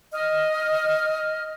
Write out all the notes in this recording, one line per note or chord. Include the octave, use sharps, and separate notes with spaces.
D#5 F6